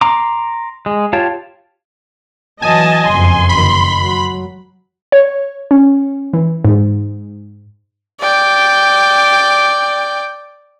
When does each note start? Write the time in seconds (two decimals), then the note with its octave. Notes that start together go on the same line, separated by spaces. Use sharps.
0.01 A#5 C6 D6
0.86 G#3
1.13 F4 G4 C#5 A5
2.62 E3 F#3 D#5 G#5 A5
3.09 F#1 F2 C6
3.49 F#1 D#3 B5
4.02 F#3
5.12 C#5
5.71 C#4
6.34 E3
6.65 G#2
8.21 D5 G5